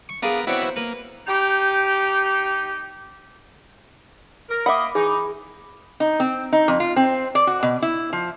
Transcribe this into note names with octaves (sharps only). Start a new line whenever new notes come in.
C#6
B3 D4 F4 G#4 A#4
B3 C4 D4 E4 F#4 C#5
C5
A#3 B4
D#4 G4
A#4
A#3 D#5 E5 F#5 B5 D6
E3 D#4 G#4
D#4
C4
D#4
F2
F4
C4
D5
F#4
B2
E4
F3